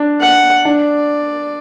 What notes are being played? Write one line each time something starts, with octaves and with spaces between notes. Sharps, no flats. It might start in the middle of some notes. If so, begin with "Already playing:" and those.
Already playing: D4
F#5
D4 D5